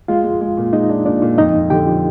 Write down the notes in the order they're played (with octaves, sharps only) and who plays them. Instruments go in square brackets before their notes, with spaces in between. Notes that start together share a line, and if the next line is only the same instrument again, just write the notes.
[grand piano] G#3 [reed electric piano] F4 F5
[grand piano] G#3
G#3
A#2
[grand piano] G#3 [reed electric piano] D#4 D#5
[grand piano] D4
[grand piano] A#2 [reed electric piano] D4 D5
[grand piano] A#2
[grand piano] F2 [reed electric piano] D#4 D#5
[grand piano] F2
[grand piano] D3 [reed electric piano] G4 G5
[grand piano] F3